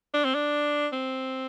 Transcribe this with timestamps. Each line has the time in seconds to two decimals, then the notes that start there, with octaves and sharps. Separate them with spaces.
0.14 D4
0.25 C4
0.35 D4
0.93 C4